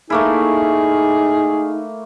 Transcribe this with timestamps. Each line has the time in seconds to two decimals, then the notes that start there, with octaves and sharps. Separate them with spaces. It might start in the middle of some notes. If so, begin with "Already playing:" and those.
0.10 A3 A#3 D#4 E4 G#4